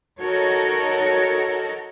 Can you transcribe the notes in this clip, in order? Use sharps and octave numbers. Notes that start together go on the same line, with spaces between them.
D#4 F#4 A4 A#4 C#5